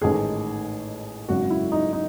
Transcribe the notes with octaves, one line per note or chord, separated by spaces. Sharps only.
A1 G#2 D#3 A3 G#4
G#1 F#2 C#3 F#4
E4
D#4
D#4